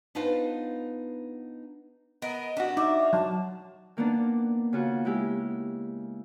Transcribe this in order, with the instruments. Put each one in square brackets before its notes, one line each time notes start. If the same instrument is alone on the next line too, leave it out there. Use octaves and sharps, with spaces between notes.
[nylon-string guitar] B3 D4 D#4 F4 B4 C5
[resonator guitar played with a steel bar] B3 [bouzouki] A#4 [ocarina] D#5
[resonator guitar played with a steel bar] D4 F#4 [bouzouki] G4
[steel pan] D#4 [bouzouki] E5 [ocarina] D6
[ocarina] F5
[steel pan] F#3 [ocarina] A5
[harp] D#3 A#3 B3 D4
C#3 F4 F#4
G#3 E4 G4